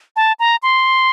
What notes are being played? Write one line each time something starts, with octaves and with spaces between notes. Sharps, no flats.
A5
A#5
C6